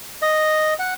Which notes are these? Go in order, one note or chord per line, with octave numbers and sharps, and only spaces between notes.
D#5
F#5